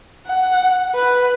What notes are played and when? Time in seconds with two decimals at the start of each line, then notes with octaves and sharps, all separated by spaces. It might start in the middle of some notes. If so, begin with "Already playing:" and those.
0.27 F#5
0.95 B4